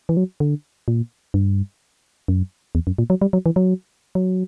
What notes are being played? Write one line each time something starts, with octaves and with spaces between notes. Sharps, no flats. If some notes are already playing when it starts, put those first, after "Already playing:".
E3
F#3
D3
A#2
G2
F#2
E2
F#2
A#2
F#3
G3
F#3
E3
F#3
F#3